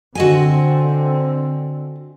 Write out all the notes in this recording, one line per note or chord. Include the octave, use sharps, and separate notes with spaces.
D3 C4 F#4 D#5 G#5